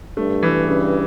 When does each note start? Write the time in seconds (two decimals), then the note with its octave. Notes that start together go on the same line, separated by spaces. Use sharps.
0.17 G2 A3
0.43 E3
0.68 C#3